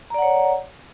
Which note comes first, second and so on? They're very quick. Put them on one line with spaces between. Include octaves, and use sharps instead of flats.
A#5 D5 F#5 C#5